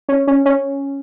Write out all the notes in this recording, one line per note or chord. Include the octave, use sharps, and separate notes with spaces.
C#4
C#4
C#4